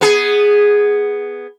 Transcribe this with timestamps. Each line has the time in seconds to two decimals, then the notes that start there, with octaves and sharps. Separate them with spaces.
0.01 B3 G#4